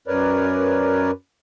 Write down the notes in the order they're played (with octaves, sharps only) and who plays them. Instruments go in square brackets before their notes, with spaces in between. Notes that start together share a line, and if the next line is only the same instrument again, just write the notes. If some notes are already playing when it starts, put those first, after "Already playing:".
[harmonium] F#2 A#4 B4 C#5 D5